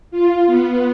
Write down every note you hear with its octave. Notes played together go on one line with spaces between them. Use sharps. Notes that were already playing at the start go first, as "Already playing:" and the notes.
F4
B3